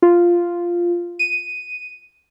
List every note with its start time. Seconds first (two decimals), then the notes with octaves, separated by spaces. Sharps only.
0.02 F4
1.19 D#7